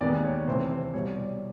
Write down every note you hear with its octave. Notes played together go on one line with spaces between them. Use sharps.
D#2 D#3 G#3 B3 D5
C#5
D2 C3 E3 A3 C4 C5
C5
C2 B2 G3 C#5
D5